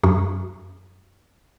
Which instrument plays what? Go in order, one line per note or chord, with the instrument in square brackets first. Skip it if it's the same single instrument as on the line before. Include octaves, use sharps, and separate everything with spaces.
[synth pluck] F#2